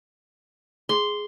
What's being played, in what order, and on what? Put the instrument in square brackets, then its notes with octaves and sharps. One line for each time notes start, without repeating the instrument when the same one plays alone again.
[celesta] G#4 [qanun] C6